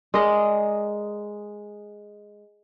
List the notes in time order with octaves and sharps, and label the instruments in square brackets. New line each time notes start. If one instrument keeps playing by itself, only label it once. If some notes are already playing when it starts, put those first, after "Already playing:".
[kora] G#3 A#4 D5 D#5